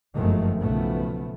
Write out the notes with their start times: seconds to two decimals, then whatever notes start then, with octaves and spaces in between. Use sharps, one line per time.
0.16 G1 F#2 D#3 F3 G#3 A3
0.61 B1 C#3 F3 A3 B3